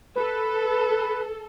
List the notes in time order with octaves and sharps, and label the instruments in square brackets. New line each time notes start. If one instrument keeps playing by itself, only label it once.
[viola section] A4 [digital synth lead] B4